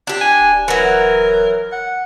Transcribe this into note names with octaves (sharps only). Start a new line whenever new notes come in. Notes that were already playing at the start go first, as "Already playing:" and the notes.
D4 G4
G#5
D1
E3 F#3 A#4
F#5